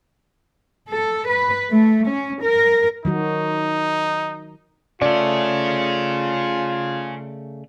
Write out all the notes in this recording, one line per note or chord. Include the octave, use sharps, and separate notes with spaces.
A4
B4
A3
C#4
A#4
D#3 F#3 D#4 F#4
C#3 A3 C#4 F4 G#4 D5